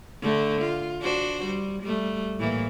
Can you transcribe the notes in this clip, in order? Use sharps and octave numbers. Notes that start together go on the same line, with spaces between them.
D3 A3
F4
D4 F#4 C5
G3
G3 A3
A2 E3 A#3